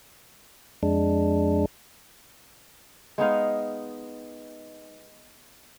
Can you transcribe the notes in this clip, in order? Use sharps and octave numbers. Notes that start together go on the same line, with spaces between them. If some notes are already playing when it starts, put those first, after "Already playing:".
F2 G#3 D4
G#3 B3 D#4 F5